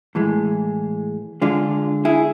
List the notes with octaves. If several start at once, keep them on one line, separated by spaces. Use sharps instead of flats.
A2 E3 G#3
D3 G#3 D4 F4
E4 G#4